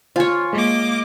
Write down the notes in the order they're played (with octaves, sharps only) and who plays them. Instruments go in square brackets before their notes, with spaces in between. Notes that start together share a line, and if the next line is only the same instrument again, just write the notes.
[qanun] F4 C#5 [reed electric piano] C5 F5 G#5
[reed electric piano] G#3 [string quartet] A#3 D#5 D6